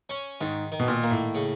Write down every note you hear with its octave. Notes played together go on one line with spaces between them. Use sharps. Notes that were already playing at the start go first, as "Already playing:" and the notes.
C#4
G#2 D#3
D#3
B2
A#2
A#3
A2
C#3